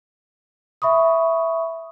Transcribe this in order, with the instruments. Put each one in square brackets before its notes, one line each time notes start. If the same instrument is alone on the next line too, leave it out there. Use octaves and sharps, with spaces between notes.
[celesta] E5 B5 C#6 D#6